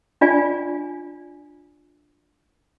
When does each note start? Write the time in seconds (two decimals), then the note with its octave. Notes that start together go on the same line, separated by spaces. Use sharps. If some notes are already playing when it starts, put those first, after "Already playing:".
0.21 D4 F4 D5 G#5